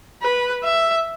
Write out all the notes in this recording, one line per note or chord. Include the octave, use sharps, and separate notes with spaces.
B4
E5